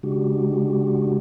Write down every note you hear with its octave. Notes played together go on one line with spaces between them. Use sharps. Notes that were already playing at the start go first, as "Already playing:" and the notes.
C#3 G#3 D4 F#4 G4